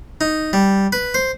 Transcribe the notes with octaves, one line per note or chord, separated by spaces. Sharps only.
D#4
G3
B4
C5